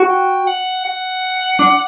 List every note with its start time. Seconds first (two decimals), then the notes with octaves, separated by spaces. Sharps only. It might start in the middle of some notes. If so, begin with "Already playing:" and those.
Already playing: F#4
0.09 G5
0.47 F#5
0.85 F#5
1.59 D4